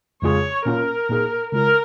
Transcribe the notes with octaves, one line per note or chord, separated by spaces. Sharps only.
F2 C#3 G#3 F4 G#4 C#5
A#2 A#3 C#4 F4 A#4
A#2 A#3 D#4 G#4
C#3 G#3 F4 A#4